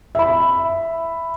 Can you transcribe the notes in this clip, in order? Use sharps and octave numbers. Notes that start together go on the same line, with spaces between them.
E5 B5